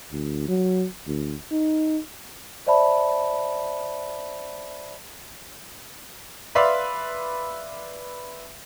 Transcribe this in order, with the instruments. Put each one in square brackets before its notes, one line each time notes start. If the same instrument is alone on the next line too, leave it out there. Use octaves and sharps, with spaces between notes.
[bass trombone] D2
F#3
D2
D#4
[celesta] C5 D5 E5 A5 B5
[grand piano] B4 D5 E5 F5 B5 C6